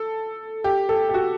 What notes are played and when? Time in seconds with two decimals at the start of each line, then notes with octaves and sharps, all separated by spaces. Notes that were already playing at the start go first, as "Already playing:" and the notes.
Already playing: A4
0.64 G4
0.89 A4
1.09 G4
1.14 F#4